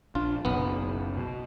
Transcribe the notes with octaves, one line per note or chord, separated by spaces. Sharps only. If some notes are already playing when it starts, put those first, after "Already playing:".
A#1 D4 F4
F#1 B1 B3
B2